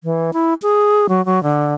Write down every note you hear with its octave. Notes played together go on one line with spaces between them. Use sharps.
E3
E4
G#4
F#3
F#3
D3